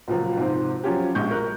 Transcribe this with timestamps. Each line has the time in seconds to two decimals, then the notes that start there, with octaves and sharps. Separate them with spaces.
0.08 C#2 A#2 F3 F#3
0.37 G#2 C3 F3 C4
0.84 F3 F#3 C#4 F4 G4
1.15 A#1 G#3 C#6 G6
1.31 A#4 C#6 F#6